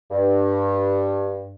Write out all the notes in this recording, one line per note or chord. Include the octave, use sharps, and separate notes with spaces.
G2